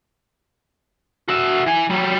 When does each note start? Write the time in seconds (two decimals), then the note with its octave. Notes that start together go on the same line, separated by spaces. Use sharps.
1.28 F#4 E5
1.66 E3 G#5
1.90 F#3 G3